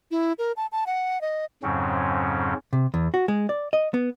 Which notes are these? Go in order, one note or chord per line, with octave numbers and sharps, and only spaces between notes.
E4
A#4
A5
A5
F#5
D#5
F2 G#2 C#3 F#3 C4 C#4
C3
E2
F#4
G#3
D5
D#5
B3